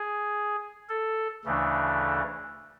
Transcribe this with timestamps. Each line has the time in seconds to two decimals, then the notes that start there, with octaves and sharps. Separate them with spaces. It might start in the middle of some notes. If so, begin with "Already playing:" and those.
Already playing: G#4
0.89 A4
1.45 D2 C#3 E3 A3 D4